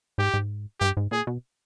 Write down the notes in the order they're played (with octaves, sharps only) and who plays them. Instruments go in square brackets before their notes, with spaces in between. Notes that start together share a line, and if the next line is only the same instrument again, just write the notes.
[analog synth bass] G#2 [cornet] G4
[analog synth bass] G#2
[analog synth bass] G2 [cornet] G4
[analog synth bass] G#2
[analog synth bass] A#2 [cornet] G#4
[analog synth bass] B2